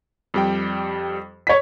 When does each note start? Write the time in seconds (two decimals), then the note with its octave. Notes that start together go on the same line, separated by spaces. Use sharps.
0.34 F2 G3 G5
1.47 C#5 B6